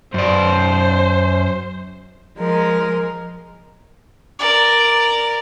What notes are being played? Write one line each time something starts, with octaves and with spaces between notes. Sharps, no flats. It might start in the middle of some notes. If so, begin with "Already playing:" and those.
F#2 C5 D5
F3 G#3 A#4
A#4 D5